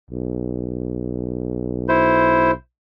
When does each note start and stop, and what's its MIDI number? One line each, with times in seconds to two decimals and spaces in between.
0.11 2.53 35
1.89 2.51 64
1.89 2.51 72